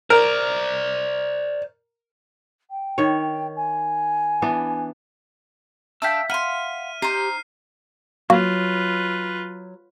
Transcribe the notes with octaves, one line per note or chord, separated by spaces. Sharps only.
A#4 C5 D5
G5
D#3 C#5
G#5
E3 B3 D4
D4 E5 F5 G5 E6 B6
F5 F#5 B5 C6 F6 D#7
D#4 G4 C5 C7
F#3 A#3 F4 F#4 B4